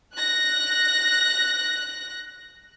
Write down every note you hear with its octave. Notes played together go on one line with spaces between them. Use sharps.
F#6 A#6